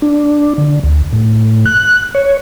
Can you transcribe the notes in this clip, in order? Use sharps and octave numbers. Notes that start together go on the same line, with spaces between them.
D4
D3
D2
A2
F#6
C#5